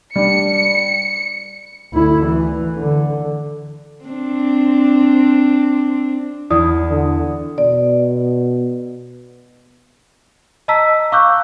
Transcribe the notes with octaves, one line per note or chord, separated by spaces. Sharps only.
G3 D4 C#7
D2 E4
E3
D3
C4 D4
E2 E4 D5 D#6
D3
B2 D5
D#5 A5 A#5 E6 B6
F5 C#6 D6 E6 F#6 G6